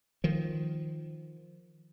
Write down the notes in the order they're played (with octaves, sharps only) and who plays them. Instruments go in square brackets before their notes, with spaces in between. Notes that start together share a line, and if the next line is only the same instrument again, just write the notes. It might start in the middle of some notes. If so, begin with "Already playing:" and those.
[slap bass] D#3 F3